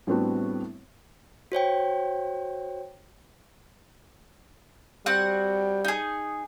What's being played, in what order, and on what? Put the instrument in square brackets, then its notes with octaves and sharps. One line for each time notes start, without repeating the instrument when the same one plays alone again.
[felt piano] A2 G3 B3 C4 D4 F#4
[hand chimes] F#4 C5 C#5 G5
[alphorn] G3 [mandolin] C4 F#4 F#5
[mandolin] D#4 G#4